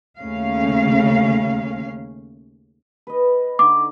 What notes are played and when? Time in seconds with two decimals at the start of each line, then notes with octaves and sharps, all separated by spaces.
0.19 D#2 C#3 A3 C#4 F5
3.07 B4 D#5
3.59 D3 D#4 D6